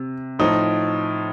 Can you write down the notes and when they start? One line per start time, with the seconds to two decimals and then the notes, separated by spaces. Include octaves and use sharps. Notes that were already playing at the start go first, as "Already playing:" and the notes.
Already playing: C3
0.39 A2 F3 D#4